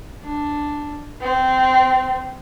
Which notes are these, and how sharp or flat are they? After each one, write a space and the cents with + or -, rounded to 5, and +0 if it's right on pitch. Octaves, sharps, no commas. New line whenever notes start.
D4 +0
C4 -20